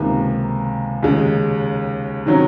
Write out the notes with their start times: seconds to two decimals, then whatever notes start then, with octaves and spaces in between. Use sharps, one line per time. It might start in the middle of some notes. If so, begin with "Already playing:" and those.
Already playing: C#2 C3 D#3 A#3
1.03 D#2 C#3 G#3
2.26 C3 D#3 F#3 C#4